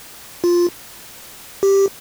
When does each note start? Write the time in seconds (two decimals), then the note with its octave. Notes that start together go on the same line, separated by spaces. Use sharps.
0.44 F4
1.63 G4